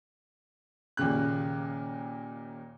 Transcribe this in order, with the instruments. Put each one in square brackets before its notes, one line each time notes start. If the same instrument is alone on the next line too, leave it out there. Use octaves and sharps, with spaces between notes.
[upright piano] D#2 A#2 C#3 F#6